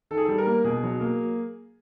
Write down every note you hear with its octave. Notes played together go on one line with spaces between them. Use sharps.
D#3 A4
G#4
G3 A4
A#4
A#3
B2 G#4
F#3
A#3